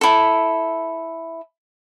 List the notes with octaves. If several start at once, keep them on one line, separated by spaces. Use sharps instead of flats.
E4 A4